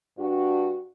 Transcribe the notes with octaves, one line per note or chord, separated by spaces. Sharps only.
G2 D4 F#4